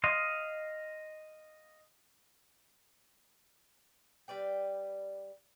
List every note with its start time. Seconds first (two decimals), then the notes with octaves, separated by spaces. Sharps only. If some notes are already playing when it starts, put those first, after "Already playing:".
0.04 D#5 F5 C6
4.28 G3 B4 D5 G5